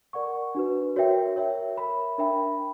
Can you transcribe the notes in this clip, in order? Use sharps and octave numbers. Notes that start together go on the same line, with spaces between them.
A#4 D5 F#5 C#6
D4 F#4 B4
F#4 A#4 C#5 E5 G5
A#4 C#5 E5
A#4 E5 B5
D4 A#4 E5 G5 B5